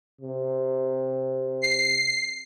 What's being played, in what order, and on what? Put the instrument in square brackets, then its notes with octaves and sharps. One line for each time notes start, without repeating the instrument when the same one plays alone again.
[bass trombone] C3
[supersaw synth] C7